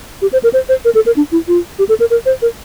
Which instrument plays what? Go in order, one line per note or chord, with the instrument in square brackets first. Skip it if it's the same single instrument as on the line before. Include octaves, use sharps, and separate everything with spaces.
[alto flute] G4
C5
A#4
C5
C5
A#4
A4
A#4
D4
E4
F4
G4
A4
A#4
A#4
C5
A#4